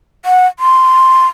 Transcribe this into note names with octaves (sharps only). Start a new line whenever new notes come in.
F#5
C6